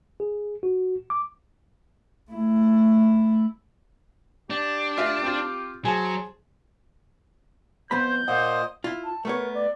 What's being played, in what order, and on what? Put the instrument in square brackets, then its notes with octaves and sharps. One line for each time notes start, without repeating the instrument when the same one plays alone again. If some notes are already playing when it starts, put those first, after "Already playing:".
[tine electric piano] G#4
F#4
D6
[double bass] A3 E4
[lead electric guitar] D4 [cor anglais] G4
[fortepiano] F4 E5
C4 F4
[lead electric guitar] F#3 [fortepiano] G#4 A5 [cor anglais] C5
[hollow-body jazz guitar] F2 B3 B5 [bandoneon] C5 [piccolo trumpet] G6
[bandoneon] A#2 A#3 C5 [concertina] D#5 [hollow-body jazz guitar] F#5
[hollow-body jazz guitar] E4 F4
[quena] A5
[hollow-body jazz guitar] A3 B3 C#5 [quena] A#4
[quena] D5